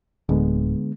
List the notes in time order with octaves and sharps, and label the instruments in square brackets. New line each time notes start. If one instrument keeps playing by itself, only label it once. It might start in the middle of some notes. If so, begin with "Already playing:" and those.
[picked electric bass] D1 [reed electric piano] D3 G#3 B3